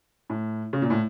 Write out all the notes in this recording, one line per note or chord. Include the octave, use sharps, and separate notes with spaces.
A2
C#3
A#2
A2